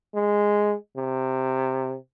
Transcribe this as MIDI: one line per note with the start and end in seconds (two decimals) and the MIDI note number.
0.15 0.76 56
0.98 1.96 48